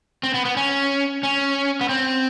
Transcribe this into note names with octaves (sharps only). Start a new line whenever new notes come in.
C4
B3
B3
C#4
C#4
B3
C4